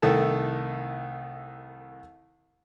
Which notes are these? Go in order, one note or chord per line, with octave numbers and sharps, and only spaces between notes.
C2 D#3 A3 E4 A4 A5